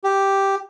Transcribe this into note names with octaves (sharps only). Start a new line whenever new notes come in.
G4